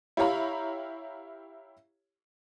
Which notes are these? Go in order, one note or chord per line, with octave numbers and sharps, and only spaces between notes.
E4 G4 C#5 F5 A#5 B5